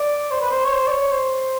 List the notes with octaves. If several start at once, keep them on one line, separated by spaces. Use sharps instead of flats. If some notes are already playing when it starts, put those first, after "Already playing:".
Already playing: D5
C5
B4
C5
C#5
C5
D5
C#5
C5